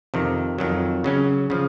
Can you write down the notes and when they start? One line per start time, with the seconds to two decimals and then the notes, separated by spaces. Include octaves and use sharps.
0.14 F2 C3 D#3
0.58 F2 D#3 F#3
1.04 C#3 F#3 C#4
1.50 C#3 F3